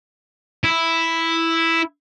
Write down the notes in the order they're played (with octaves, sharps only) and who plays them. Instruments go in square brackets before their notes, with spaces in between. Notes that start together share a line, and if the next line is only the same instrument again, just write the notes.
[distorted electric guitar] E4